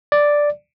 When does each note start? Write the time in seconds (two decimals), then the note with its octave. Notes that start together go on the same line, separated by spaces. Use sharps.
0.12 D5